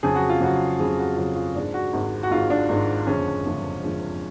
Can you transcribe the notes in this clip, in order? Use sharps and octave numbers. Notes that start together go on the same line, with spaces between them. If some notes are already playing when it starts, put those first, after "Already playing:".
F2 C#3 F#3 G#4
F#4
F4
F2 C#3 F#3 F#4
F2 C#3 F#3 G#4
F#4
F2 C#3 F#3 F4
F4
G#1 G#2 G#3 D4
F#4
G#1 G#2 G#3
F#4
G#1 G#2 G#3 F4
D4
G#1 G#2 G#3
F#1 F2 D3 F3 G#3 C#4
F#1 F2 D3 F3 G#3
F#1 F2 D3 F3 G#3